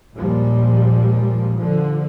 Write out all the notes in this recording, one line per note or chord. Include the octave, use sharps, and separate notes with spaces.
A#1 D#2 A#2 F3 G3 G#3
D3 F3